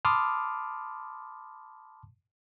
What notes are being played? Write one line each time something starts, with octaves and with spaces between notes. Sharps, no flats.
A5 B5 C6 D6 D#6 F6